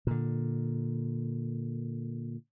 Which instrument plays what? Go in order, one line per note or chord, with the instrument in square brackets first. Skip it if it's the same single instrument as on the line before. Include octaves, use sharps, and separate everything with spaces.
[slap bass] A#2 D3